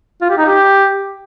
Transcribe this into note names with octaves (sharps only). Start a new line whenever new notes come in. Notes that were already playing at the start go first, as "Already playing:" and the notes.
F4
G4
D#4
G4